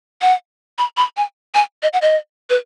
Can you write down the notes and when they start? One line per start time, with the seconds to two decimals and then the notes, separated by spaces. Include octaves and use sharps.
0.21 F#5
0.78 B5
0.97 B5
1.17 G#5
1.55 G#5
1.83 D#5
1.93 F#5
2.02 D#5
2.50 B4